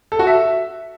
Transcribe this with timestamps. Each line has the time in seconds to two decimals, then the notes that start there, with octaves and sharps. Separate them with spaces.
0.12 A4
0.19 F#4
0.27 E5